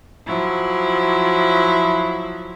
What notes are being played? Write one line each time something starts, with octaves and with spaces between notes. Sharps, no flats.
F3 F#3 E4